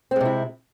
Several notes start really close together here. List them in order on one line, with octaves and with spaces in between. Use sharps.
C4 G#3 C3 E4